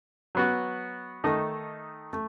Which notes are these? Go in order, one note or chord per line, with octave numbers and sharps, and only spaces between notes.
F#3 B3 F#4
D#3 A3 D#4 A4 D#5
A3